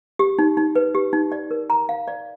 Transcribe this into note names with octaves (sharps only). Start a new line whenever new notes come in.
G4
D#4
D#4
B4
G4
D#4
D5
A#4
A#5
F5
D5